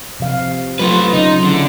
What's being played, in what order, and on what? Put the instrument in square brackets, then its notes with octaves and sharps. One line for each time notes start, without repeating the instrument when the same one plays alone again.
[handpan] C3 F3 F5
[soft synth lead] F#3 [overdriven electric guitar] A3 B4 [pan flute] F4
[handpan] C#3 [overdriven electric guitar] D#4
[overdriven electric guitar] D3 [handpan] C#4 E4